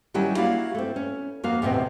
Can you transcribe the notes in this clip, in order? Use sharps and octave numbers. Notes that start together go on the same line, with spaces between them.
D#3 F#3 G3 C#4 E4
A#3 E4 F#4 D5 F5 F#5
A3 C4
C#4
F2 A#3 F#4 F5
E2 A2 C3 B3 C4 D#5